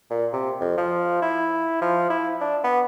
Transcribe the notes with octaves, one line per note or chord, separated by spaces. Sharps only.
A#2
C3
F2
F3
E4
F3
E4
D4
B3